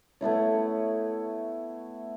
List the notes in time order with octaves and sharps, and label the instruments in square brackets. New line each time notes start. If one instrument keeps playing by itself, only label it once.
[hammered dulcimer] A3 B3 E4 C#5